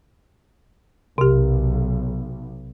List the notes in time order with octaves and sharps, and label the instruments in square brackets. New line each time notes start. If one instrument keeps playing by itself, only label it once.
[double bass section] B1 [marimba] C3 G4